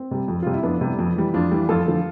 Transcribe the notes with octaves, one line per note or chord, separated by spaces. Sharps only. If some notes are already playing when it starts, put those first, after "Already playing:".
Already playing: C4
C3 G3
F2
C3 G3 F4
E4
F2 B3 D4
C3 G3
F2
E3 G3
F2 D4 F4
E3 G3
F2 F4 A4
D3 F3